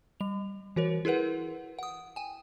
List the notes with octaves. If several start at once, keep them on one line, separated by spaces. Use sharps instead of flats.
G3 F7
E3 F#4 A#4 C#5
E4 G#4 A#4 B4 F#5
F#5 D#6
G5 G#5